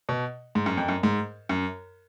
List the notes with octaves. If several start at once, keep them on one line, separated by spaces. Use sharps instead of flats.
B2
G#2
F#2
F2
F#2
G#2
F#2